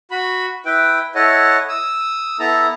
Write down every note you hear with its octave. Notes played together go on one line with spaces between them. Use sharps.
F#4 B5
E4 B4 G5
E4 A4 C#5 D#5 F#5
D#6 E6
B3 E4 A4 A#5